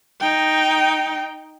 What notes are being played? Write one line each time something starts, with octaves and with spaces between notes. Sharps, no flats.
D#4 G5